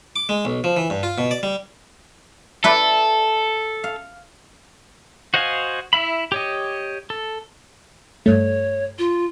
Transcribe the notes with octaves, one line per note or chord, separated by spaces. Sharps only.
D6
G#3
B1
F3
E3
G2
F4
B2
D5
G3
E4 A4 B4 D5
F5
F#4 C5 D#5 F5 G#5
E4 E5 B5
G4 C#5 D#5
A4
G2 A3 C#5
F4